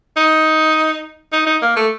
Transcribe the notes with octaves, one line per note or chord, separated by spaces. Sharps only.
D#4
D#4
D#4
A#3
A3